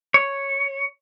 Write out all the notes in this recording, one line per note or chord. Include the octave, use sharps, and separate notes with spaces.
C#5